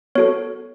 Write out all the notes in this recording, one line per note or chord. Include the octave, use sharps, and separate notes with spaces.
B3 F#4 A4 C#5